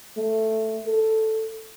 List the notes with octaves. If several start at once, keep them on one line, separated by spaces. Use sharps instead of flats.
A3
A4